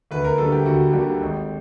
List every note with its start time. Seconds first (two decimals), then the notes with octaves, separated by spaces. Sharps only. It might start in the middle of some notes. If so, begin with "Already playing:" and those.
0.11 D2 B4
0.25 A#4
0.38 D3 G3 A#3 A4
0.52 G4
0.66 D2 F#4
0.93 D3 G3 A#3 G4
1.21 G#1